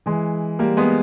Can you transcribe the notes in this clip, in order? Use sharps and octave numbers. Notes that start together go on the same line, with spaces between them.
E3 G#3
G3 A#3
G#3 B3